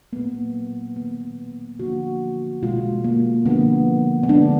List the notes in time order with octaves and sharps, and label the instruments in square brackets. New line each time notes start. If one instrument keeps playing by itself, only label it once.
[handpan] A#2 F#3 A#3 B3
D#3 A#3 B3
D3 F3 A#3 F#4
B2 G#3 F4
A#3
D3 F3 A#3 B3
B3
D3 G#3 D4